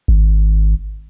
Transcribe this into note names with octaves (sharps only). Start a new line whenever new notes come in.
G#1